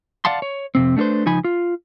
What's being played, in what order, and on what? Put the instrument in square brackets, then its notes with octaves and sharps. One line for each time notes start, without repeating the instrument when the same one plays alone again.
[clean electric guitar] D5 F5 F#5 A5 C6
C#5
F2 C3 C4
A3 D4 F4 B4 C5
C#2 F3 D#4 G#5 B5
F4